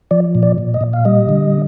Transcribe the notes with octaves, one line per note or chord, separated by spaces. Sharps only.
F3 D5
A#2
D5
A#2
D#5
A#2
F5
G3 D#5
D3